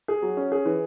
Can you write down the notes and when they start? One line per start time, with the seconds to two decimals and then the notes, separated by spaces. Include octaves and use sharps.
0.08 G#4
0.22 F#3
0.37 C#4
0.52 G#4
0.65 E3